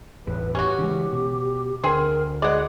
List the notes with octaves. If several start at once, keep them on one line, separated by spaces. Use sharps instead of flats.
G1 E2 A2 B4
C#4 F#4 G4
C#3 E3 G#3
B2
D2 D3 C4 G#4 A#4
G#3 D5 D#5 F#5